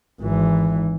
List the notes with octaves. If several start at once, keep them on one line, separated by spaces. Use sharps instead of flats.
G#1 E3